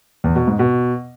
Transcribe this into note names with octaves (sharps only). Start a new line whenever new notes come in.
E2
B2
G#2
B2